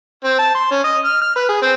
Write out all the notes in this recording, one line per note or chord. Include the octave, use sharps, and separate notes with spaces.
C4
A5
C6
C#4
D#5
F6
F6
B4
G#4
C4